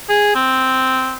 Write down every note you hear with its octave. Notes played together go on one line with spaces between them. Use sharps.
G#4
C4